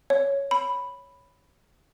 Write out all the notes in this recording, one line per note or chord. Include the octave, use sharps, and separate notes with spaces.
C#5
B5